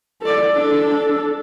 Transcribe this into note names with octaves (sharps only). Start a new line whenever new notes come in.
A4 D5
D4 A4